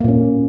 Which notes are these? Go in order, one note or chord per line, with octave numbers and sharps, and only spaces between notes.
A#2 A#3 C#4